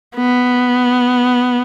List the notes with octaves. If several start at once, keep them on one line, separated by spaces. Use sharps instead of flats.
B3